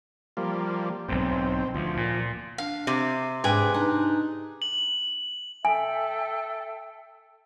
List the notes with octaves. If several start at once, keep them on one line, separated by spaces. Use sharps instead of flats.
F3 G3 A#3
B1 G#2 C4
D2 F3
A#2
D4 F5
C3
G#2 D4 G#4 B4 G5
D4 D#4
F#7
A4 E5 G5 G#5